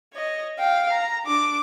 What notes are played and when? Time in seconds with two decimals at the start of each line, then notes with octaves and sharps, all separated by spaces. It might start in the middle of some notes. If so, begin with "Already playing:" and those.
0.13 C#5 D#5
0.58 F5 G5
0.92 A#5
1.25 D4 D6